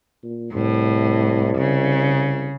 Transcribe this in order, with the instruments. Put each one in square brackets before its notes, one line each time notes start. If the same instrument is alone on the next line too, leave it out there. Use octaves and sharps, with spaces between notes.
[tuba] A#2
[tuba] C2 [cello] A2
[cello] C#3